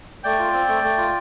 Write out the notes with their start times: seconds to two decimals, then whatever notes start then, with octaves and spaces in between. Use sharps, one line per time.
0.24 A3 D5 G5
0.39 F4
0.53 C4
0.68 A3
0.83 A3
0.98 F4